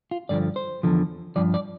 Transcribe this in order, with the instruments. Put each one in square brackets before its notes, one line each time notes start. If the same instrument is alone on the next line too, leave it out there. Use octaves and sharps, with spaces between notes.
[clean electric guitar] F4
G2 D3 F3 D5
C5
E2 D3 F3
G2 F3 D5
D5